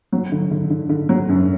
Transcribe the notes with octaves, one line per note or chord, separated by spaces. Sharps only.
F#3
D3
D3
D3
D3
F#3
F#2